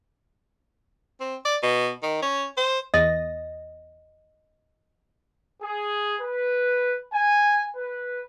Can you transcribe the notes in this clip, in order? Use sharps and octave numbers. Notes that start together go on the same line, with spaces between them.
C4
D5
B2
D#3
C#4
C5
E2 D#5 D#6 A#6
G#4
B4
G#5
B4